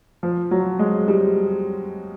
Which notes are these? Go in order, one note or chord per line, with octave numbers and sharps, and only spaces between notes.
F3
F#3
G#3
G3